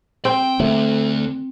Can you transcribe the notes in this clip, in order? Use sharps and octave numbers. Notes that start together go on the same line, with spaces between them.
C4 G5
D2 A3